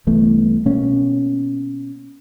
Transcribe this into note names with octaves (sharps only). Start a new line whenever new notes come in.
C2 E3 A3 B3
B2 A#3 C#4